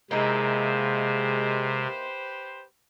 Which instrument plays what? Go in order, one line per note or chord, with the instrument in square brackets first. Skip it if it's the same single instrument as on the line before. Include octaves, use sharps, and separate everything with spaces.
[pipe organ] C3 [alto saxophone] G#3 [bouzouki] A#3 D#4 E4 [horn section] G4 B4 C5